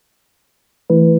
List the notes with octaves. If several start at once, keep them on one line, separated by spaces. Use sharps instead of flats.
E3 A3 E4 B4